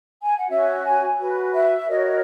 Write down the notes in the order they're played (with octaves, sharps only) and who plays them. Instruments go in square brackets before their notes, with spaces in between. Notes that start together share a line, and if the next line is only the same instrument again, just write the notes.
[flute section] G#5
F#5
C#4 F#4 C#5 E5
G#5
F#4 B4
E5
F#4 A#4 C#5 D#5